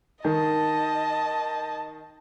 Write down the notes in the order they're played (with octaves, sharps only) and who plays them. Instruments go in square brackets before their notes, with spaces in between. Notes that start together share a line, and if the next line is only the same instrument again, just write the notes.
[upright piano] D#3 [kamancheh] D#5 A5